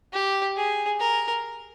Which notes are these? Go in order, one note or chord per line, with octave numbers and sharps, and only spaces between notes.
G4
G#4
A#4